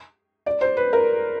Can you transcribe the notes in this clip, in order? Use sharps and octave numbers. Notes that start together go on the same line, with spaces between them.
D5
C5
B4
A#4